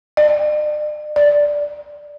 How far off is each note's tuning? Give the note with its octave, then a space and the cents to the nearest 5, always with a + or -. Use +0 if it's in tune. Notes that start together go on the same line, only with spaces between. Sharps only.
D5 +40
D5 -5